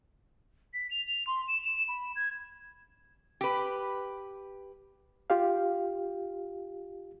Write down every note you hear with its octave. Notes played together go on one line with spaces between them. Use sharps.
B6
F7
F7
C6
E7
E7
B5
G#6
G4 B4
F4 G4 F5